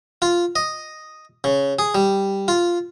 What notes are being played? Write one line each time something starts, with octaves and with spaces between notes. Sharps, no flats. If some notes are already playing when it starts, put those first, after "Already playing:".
F4
D#5
C#3
G#4
G3
F4